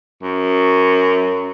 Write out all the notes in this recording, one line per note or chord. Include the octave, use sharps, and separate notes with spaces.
F#2